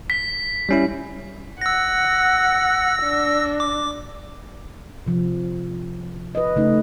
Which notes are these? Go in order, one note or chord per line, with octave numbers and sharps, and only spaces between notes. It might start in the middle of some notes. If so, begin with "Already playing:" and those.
B6
G3 C#4 E4
F#5 E6 A#6
D4
D6
C3 F3
B4 D#5
C#3 A3 D#4